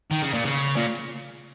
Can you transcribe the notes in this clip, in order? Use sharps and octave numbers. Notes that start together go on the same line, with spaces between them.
D#3
C#3
A#2
C#3
A#2